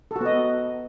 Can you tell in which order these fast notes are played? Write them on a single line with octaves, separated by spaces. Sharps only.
A4 F#4 B3 D#5